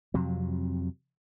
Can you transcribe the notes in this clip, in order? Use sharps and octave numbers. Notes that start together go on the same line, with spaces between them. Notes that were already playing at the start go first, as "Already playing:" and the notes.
F2 C3 F#3